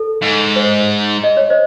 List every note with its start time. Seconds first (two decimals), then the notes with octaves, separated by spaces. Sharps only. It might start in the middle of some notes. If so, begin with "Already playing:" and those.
Already playing: A4
0.22 G#2
0.56 C5
1.24 D#5
1.37 C#5
1.50 C5 D#5